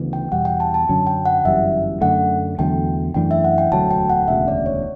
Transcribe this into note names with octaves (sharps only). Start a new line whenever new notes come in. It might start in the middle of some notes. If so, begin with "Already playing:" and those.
Already playing: D2 C#3 E3 B3
G5
E2 B2 G3 F#5
G5
A5
A5
F#2 D3 F#3 C#4
G5
F#5
G1 F#2 E3 G3 E5
F#2 D3 A3 F#5
E2 D3 F#3 A3 G5
F#2 E3 A3 D4 G5
E5
F#5
G5
E1 D2 D3 F#3 A5
G5
F#5
E1 D2 C#3 E5
D5
C#5